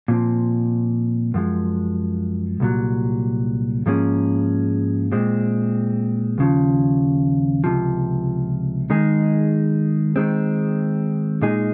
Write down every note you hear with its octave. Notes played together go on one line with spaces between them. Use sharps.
A#2 F3 C4
F#2 F3 G#3
C2 A#2 F#3
G#2 F3 A#3 C#4 G#4
A#2 G#3 C4
D#2 C#3 F3
C#2 C3 F3
D#3 G#3 D#4 G#4
D#3 G#3 C4
A#2 G#3 D#4 G#4